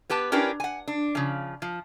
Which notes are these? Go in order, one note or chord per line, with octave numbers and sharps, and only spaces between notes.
B3 G4 B4 A5
C#4 D4 E4 G4 A#4 B4
F#5 G#5
D4
C#3 F3
F3